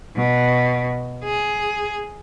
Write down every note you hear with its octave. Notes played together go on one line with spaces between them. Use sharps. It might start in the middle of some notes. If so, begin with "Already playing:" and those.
B2
G#4